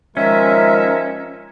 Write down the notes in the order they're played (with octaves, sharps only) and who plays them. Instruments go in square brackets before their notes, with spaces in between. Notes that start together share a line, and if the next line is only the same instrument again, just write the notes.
[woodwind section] D#3 G#3 E5 [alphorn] F3 [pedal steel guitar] C#4 [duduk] A#4